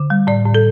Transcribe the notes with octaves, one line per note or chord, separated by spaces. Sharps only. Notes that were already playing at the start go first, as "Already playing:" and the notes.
Already playing: D3
G3
A2 D5
A2
A4